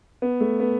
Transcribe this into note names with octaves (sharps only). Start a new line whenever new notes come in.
B3
A3
B3